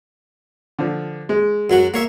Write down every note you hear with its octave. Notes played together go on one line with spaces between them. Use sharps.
D3 F3
G#3
F#2 F#3 F#4
A#3 C#5 E5